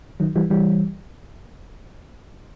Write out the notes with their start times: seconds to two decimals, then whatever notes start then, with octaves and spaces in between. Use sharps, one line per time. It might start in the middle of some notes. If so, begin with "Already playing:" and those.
0.20 D#3 F#3
0.36 E3 G3
0.50 E3 G3